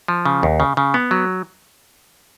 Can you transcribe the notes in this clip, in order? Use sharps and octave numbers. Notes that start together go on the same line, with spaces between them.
F3
C#3
D#2
C#3
C#3
B3
F#3